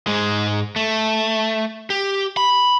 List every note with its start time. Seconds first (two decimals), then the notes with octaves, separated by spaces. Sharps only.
0.07 G#2 G#3
0.76 A3
1.90 G4
2.37 B5